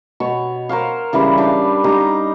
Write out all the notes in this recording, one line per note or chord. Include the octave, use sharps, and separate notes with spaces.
B2 C#5
A#4 C5 C#5 F5
C#3 E3 G3 B4
D4 B4 F5 G5
D#4 G4 F5 A#5